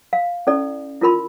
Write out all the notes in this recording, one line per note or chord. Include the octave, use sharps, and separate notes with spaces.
F5
C#4 E4 A4 D5
E4 F4 A#4 B5 C6